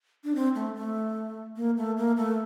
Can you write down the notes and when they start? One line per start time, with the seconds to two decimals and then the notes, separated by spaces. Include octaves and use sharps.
0.24 D4
0.35 C4
0.55 A3
0.75 A3
1.56 A#3
1.77 A3
1.98 A#3
2.17 A3